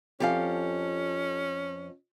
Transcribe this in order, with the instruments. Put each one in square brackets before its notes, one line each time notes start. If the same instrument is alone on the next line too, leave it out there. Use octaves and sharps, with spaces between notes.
[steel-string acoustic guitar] F2 F3 G#5 [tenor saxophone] C#4 [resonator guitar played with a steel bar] G4 A4 F5